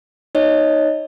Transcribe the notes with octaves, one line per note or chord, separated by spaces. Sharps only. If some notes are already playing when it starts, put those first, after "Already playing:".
D#4 C#5 D#5